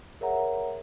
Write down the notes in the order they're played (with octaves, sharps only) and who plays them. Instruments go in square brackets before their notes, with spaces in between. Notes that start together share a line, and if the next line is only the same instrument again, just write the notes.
[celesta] G#4 A#4 C#5 E5 F#5 A#5